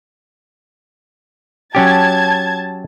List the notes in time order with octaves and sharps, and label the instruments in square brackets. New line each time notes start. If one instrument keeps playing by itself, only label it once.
[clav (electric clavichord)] F#3 C#4 G4 [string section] A5 G#6